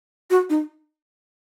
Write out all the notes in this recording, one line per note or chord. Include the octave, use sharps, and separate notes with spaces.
F#4
D#4